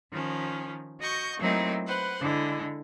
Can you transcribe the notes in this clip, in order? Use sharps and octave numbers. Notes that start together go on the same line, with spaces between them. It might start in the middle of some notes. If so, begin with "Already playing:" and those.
D#3 F3 C#4
F#4 D#5 C#6 G6
F#3 A3 A#3 C4 D#4 E4
B4 C5 F#5
D3 G#3 E4